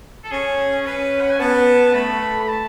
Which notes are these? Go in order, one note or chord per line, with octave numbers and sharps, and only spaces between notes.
A4
C#4 G#4
C#4 B4
F#5
G#5
B3 A5
A3 B5
B5
A5